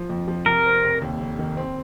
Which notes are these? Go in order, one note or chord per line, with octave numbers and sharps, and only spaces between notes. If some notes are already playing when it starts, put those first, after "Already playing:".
Already playing: F3
F2
F3
C3 A#4
C4
F1
D#2
F1
D#3
C4